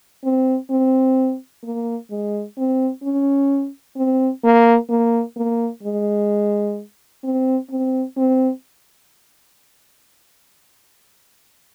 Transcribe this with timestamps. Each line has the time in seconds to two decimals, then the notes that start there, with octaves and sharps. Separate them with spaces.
0.24 C4
0.70 C4
1.63 A#3
2.11 G#3
2.57 C4
3.03 C#4
3.96 C4
4.44 A#3
4.90 A#3
5.36 A#3
5.83 G#3
7.24 C4
7.70 C4
8.17 C4